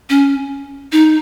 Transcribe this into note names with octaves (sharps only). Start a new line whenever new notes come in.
C#4
D#4